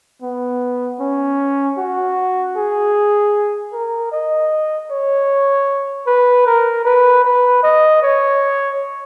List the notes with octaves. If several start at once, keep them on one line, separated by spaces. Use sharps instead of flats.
B3
C#4
F#4
G#4
A#4
D#5
C#5
B4
A#4
B4
B4
D#5
C#5